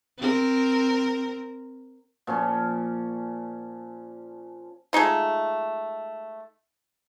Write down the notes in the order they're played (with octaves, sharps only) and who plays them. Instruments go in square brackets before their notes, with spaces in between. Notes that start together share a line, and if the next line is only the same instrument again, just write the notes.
[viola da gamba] C4 A#4
[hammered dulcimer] A#2 F3 C#4
[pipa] G#3 A3 D#4 F4